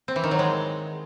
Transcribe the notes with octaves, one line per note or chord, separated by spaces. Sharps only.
C4
E3
D#3
F#3
G#3